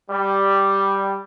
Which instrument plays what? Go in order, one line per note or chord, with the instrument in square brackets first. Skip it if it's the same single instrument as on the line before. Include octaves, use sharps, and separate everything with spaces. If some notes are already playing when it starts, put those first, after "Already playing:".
[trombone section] G3